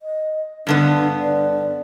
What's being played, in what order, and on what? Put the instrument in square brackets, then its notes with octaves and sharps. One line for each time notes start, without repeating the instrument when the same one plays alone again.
[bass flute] D#5
[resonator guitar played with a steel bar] G2 D3 B3 [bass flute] D4
[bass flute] D5